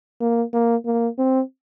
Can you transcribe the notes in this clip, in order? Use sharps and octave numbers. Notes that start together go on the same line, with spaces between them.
A#3
A#3
A#3
C4